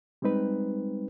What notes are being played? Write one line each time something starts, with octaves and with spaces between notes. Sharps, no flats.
G3 G#3 C4 D#4 B4